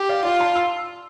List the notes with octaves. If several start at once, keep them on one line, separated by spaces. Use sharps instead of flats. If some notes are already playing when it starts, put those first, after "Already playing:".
Already playing: G4
D5 F5
F4 D5
A5 C6
C6 E6